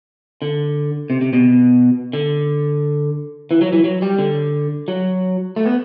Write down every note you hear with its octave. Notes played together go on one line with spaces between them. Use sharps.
D3
C3
C3
B2
D3
E3
F#3
E3
F#3
G3
D3
F#3
A3
B3